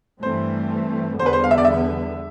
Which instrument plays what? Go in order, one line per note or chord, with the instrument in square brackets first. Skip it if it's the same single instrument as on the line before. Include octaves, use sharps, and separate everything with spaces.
[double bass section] G2 E3 A3 C4 [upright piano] C5
[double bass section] E2 D3 G3 B3 [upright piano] C5
[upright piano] B4
C5
F5
E5
D5
E5